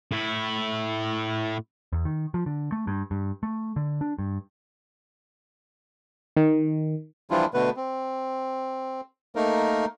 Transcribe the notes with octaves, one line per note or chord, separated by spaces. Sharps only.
A2 E4
E2
D#3
F3
D3
A3
G2
G2
A3
D3
D4
G2
D#3
E3 F3 G3 D4 E4 F4
B2 D3 A3 B3 B4
C4
A3 A#3 D#4 A#4